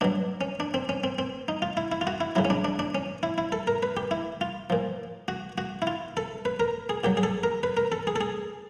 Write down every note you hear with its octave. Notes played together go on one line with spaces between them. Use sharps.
B2 F#3 D4
C#4
D4
C4
C#4
C4
C4
D#4
F4
E4
E4
F4
F#4
E4
C#3 F#3 E4
C#4
D4
D4
D4
C#4
E4
E4
A4
A#4
B4
G4
E4
F4
A#2 F3
F#4
F#4
E4
F4
A4
B4
A#4
G#4
A#2 F#3 G4
G#4
A4
A#4
B4
A#4
A4
G#4
A4
G#4